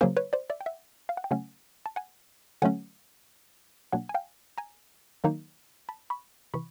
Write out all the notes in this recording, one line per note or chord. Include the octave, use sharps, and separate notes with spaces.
C#3 F#3 A#3 C#4 A#4 C5
B4 C#5
C5 D5
D5 E5
G5
E5 F#5
F5
F#5
G5
C#3 F#3 A3 C#4 F#5 G#5
A5
F#5 G#5
D3 F#3 A3 C#4 F#5 G#5
B2 F#3 A#3 D4 F#5 G#5
G#5
F5 G5
G#5 A#5
D#3 F#3 A#3 D#4
A5 B5
B5 C#6
C3 E3 B5 C#6